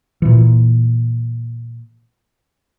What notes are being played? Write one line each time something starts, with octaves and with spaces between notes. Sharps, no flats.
A#2 E3